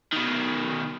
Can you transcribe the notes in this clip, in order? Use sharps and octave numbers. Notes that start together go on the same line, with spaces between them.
B2 D#3